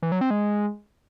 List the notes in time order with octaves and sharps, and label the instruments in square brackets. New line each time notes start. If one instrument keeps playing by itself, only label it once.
[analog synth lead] E3
F#3
C4
G#3